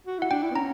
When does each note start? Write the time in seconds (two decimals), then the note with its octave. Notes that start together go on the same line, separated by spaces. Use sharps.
0.07 F#4
0.18 E4
0.22 F#5
0.31 D4 G5
0.43 E4
0.51 B3
0.55 C#4 A#5